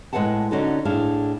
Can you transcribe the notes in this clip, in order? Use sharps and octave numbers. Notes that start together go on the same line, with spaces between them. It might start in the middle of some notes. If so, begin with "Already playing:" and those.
A2 G#3 A#3 B4 F#5 A5
D3 C#4 D#4 F#4 A4
A2 D4 G#4 F5